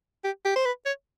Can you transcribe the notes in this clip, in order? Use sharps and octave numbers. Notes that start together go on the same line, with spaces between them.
G4
G4
C5
B4
C#5